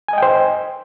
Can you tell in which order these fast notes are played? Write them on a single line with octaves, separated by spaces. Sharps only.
G#5 D#5 G5 C5